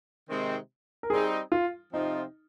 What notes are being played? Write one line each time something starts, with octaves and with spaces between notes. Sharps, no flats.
C3 D#3 G#3 C4 D#4
A#4
G3 C4 D#4 G#4
F4
C3 F3 C4 D#4 F4